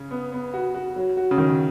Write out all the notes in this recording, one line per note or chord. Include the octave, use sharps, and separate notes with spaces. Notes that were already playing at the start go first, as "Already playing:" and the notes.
Already playing: C#3
B3
B3
F#4
F#4
F#3
F#4
C#3
D#3 F#3